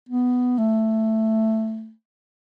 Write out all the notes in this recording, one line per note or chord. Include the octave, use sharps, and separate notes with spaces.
B3
A3